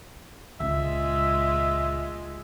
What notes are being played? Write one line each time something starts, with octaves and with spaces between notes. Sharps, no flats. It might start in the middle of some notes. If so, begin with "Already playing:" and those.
C#2 A#2 G#3 F4 E5